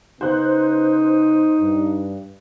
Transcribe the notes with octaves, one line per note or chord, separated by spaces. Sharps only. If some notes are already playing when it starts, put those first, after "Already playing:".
C#3 B3 D#4 C5 F#6
G2